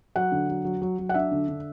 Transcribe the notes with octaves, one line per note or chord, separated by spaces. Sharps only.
F#3 F#5
D3
F#3
F#3
F#3
F#3
F#5
D4 E5
D3
D3